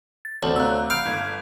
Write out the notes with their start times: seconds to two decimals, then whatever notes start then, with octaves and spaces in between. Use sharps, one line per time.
0.25 A6
0.43 D2 C4 C#5 A5 F#7
0.56 C3 F5 A#5 E6 F#6
0.90 F5 B5 G6 D7
1.06 G1 G#6